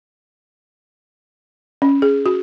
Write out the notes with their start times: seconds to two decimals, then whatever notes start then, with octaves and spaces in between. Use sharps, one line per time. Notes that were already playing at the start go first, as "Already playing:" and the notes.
1.82 C#4
2.02 G#4
2.26 F#4